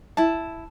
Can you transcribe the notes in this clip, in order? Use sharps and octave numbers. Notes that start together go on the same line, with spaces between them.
E4 A5